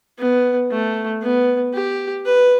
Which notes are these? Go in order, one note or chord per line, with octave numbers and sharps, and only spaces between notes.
B3
A3
B3
G4
B4